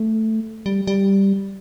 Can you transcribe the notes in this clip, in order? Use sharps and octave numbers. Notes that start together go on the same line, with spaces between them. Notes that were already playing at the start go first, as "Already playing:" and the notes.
Already playing: A3
G3
G3